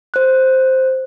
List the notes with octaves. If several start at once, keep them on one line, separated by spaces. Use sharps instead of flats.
C5 F#6